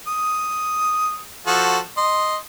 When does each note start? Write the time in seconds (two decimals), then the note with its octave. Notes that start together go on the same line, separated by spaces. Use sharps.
0.07 D#6
1.47 F3 F#4 A4
1.97 D#5 C6